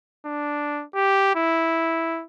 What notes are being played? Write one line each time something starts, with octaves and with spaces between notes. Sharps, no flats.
D4
G4
E4